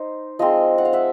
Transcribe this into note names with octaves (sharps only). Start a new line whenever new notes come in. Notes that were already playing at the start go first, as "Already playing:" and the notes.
Already playing: D#4 C5
F3 G#3 C4 D#5 F5
F#5
F5
E5 F#5